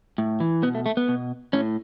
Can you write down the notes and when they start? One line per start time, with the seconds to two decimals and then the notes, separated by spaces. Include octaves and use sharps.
0.18 A2
0.40 E3
0.63 B2 B3
0.75 A3
0.86 A3
0.97 B3
1.08 B2
1.53 A2 C#4